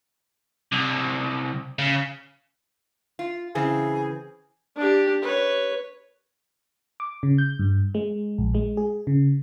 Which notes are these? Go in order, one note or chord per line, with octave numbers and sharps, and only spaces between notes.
C2
C#3
F4
C#3 E3 C4 G#4
D4 G4
B4 C#5
D6
C#3
G6
G2
G#3
A#1
G#3
G#4
C#3